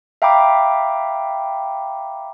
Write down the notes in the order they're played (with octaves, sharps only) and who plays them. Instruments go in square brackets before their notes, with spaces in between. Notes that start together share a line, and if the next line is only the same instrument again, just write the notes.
[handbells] E5 F5 G5 A#5 B5 D6